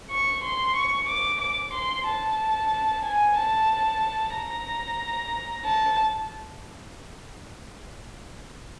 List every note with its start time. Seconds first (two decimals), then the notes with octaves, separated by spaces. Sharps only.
0.11 C#6
0.44 C6
0.76 C#6
1.09 D6
1.41 D6
1.73 C6
2.07 A5
3.05 G#5
3.36 A5
4.35 A#5
5.65 A5